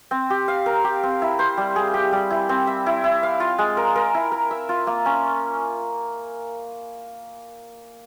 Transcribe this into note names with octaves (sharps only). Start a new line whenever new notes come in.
C4
G4
F5
A#4
G4
C4
E4
C5
G3
G#4
G4
G3
E4
C4
E5
E4
E4
F5
F4
G#3
A#4
A#4
E4
A#4
E5
F4
A#3
C#4